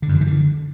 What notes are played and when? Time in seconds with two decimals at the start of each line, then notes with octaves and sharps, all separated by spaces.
0.02 D3
0.09 F#2
0.15 D#3
0.21 E3
0.27 D3